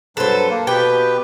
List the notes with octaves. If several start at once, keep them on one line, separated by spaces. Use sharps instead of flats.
G2 F#3 A4 B4 C5
A#3
B2 G4 B4 G5